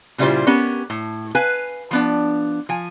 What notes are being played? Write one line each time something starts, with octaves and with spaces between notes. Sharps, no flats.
A#2 C#3 G3 E4 F4 C5
B3 C#4 G4 A#4
A2
B4 F5 G#5
F3 B3 D4
F3 G#5